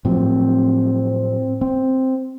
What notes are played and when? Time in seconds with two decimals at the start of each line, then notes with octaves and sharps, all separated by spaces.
0.05 A2 F3 F#3 C4
1.61 C4